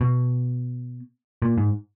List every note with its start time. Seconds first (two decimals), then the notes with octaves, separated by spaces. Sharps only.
0.01 B2
1.42 A#2
1.58 G#2